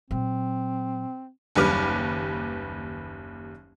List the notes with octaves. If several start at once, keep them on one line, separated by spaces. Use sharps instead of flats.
A#2 F#3 C4
F#1 D#2 G3 B4 D6 F6